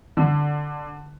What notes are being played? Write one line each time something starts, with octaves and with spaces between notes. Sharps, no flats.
D3